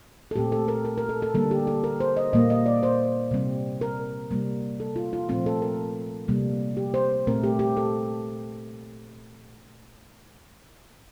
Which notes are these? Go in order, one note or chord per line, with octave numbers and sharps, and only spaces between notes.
A4
A#2 A3 C4 G4
A4
A#4
A#4
A#4
A4
A4
D3 G3 A#3 A4
G4
A4
A#4
C5
D#5
A#2 G3 A#3 D#5
D#5
D5
C5
C3 G3 C4
A#4
C3 G3 A#3
A4
F4
F4
A#2 F3 A3 C4 F4
A4
A#4
C3 G3 A#3
G4
C5
A#2 A3 C4 A#4
G4
G4
A4